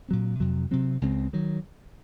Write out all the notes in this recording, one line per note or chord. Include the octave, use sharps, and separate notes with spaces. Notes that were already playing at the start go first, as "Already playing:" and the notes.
A#2 F#3 C4
F2 C3 F#3
C3 F#3 C4
C#2 C#3 G#3 C4
D#3 F#3